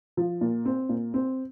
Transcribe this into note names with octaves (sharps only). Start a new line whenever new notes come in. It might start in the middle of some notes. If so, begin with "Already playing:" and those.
F3
A#2
C4
A#2
C4